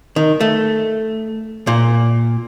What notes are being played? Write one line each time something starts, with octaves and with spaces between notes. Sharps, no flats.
D#3
A3
A#2